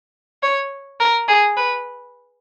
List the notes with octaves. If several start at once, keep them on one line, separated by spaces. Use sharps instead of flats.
C#5
A#4
G#4
B4